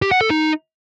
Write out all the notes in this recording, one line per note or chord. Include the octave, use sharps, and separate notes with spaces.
G4
F#5
A4
D#4